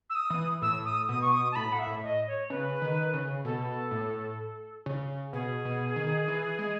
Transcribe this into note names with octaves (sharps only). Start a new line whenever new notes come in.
E6
D#6
E3
A2 E6
D#6
B2 D#6
C#6
D#6
A5
A2 B5
F#5
E5
A2
D#5
C#5
C#3 B4
D#3
C#3
B2 A4
A2
C#3
B2 G#4
B2
D#3
E3
G#3